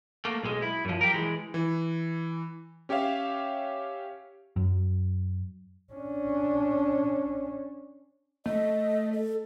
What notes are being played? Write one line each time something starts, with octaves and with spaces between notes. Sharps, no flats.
A3 A#3
B1 G#3
E4
F#2 F3
G4 A#4
E3 G#3
E3
C#4 G4 C#5 E5 F5
F#2
C#4 D4
A3 D#5
A4